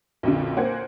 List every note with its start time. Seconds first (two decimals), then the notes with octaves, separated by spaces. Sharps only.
0.23 B1 F2 A#2 D3
0.57 A#3 C5 F#5 G#5 G#6